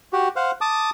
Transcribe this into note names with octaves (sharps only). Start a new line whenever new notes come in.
F#4 G4
C5 F5 F#5
A5 D6 D#6